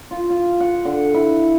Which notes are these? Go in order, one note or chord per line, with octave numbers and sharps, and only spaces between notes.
F4
F4
F#5
D3
E4